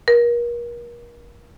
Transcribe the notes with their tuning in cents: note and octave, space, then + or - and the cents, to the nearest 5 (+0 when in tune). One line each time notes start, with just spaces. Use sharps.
A#4 +35